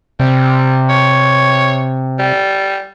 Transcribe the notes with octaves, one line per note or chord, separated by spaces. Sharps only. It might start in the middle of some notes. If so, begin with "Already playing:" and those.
C3 G3
C#5
G3